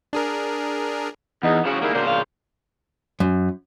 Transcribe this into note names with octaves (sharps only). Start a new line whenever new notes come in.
D4 G#4 A#4
E2 B3 D#4 G#4
C#3 F3 F#4
D#3 G3 A#3 E4 G#4
C#3 A#3 D4 F#4 C5
A#2 D4 F5
F#2